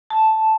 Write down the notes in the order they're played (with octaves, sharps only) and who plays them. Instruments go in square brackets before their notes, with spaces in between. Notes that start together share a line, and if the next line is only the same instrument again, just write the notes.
[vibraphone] A5